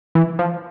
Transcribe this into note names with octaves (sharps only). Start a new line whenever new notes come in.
E3
F3